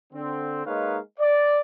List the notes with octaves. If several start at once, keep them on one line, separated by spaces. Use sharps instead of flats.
D3 C4
G#3 A#3 D#4 B4 C#5 F5
D5